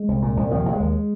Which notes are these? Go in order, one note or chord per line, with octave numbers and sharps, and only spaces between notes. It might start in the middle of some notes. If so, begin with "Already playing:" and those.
Already playing: G#3
C2
A#2
C2
D#2 F3
D#2
G#3
D#2